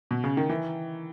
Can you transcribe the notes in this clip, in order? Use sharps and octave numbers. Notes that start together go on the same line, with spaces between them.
B2
C#3
D#3
E3